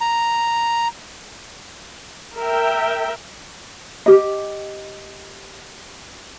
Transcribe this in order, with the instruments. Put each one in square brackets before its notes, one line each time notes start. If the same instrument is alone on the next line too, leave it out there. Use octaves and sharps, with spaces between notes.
[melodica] A#5
[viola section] A#4 E5 G5
[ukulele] G4 D#5